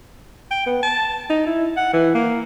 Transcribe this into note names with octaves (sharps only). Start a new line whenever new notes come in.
G5
B3
A5
D#4
E4
F#5
E3
A#3